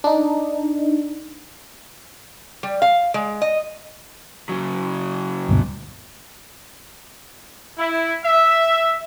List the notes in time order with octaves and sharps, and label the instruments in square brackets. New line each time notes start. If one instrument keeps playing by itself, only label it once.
[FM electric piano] D4 D#4
[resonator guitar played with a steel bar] G3
F5
G#3
D#5
[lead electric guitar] C#3 F#3
[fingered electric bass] D2 G2 B2
[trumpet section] E4
E5